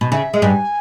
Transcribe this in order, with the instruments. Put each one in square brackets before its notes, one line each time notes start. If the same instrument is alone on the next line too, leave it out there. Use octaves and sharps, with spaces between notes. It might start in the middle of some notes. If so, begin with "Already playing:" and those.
[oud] B2
[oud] C#3 [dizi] E5
[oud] G#3
[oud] G2 G3 [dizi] G#5